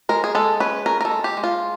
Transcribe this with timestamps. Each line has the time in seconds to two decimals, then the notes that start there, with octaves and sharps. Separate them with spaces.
0.09 G#3 A#4
0.24 G#4
0.35 G#3 A4
0.60 C#4 B4
0.86 C#4 A#4
1.01 A#4
1.05 A4
1.11 G#3
1.24 G4
1.37 G#3
1.44 F4